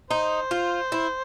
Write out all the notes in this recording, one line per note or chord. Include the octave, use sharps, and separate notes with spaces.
D#4 C5
F4
E4